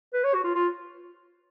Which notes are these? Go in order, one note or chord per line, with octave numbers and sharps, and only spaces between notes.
B4
C#5
F#4
F4
F4